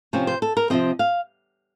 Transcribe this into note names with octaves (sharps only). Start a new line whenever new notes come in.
C3 F3 C4 C#4
C5
A4
A#4
C3 F3 C4 D#5
F5